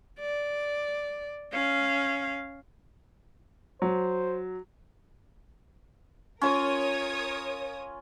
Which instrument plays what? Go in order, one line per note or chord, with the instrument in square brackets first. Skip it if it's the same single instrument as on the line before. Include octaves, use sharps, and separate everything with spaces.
[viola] D5
C#4 F5
[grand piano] F#3 [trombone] C5
[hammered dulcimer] C#4 F4 [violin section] A#4 C#5 D#6